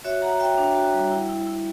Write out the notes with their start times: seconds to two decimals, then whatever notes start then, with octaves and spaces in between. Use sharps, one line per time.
0.04 F#4 C#5 E5
0.22 F#4 F#5 A#5
0.40 F#4 E5 G5
0.58 D4
0.75 F#4
0.94 G3
1.11 E4
1.29 E4
1.47 E4